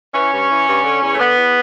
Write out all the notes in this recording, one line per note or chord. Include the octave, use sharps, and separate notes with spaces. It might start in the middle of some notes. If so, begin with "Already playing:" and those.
E3 C#4
G2
E3
G2
D3
E2
A3
D3 B3
E2